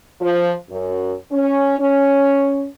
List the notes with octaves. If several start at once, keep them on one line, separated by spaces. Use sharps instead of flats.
F3
F#2
C#4
C#4